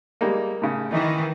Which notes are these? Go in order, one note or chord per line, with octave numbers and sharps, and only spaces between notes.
G3 G#3 A#3
A2 C#3
D#3 E3 D#4